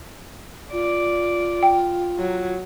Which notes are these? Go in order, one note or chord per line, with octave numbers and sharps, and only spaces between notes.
F4 D5
G5
F#3